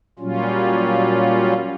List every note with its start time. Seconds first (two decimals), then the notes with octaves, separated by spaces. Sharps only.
0.19 A#2 F#3 G3 C#4 F4